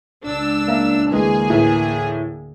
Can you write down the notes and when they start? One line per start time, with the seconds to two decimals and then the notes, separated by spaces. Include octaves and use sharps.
0.25 C#2 D4 E6
0.68 A#3 E5
1.10 D2 E3 G#3 A#3 G#4
1.50 A2 E3 E5